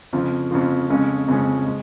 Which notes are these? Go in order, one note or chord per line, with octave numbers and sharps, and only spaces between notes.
F2 C#3 F3
F2 C#3 F3
F2 C#3 G#3 C#4
F2 C#3 G#3 C#4
G#3